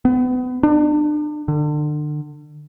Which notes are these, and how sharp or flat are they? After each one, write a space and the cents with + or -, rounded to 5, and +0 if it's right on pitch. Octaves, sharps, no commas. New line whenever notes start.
B3 +30
D4 +35
D3 +30